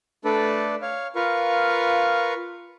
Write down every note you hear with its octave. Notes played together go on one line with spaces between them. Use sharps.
A3 D4 A4 B4 D5
C#5 F5
F4 A#4 B4 F5 C#6